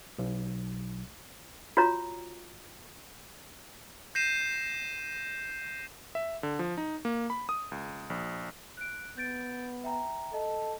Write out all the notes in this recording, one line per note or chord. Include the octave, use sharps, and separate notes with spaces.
B1
F4 F#4 C#5 A#5
G6 A#6 C7 D#7 E7
E5
D3
F3
D#4
A#3
B5
D#6
C#2
A#1
F#6 D7
B3 G6 A6 D7
E5 G5 A#5
A4 D#5